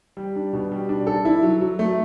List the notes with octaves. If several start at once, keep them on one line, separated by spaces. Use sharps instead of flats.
G3
D4
B2
G3
D4
A4
E4
F#3
F#3
A3